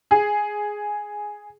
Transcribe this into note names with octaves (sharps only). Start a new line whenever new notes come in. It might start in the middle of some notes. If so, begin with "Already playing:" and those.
G#4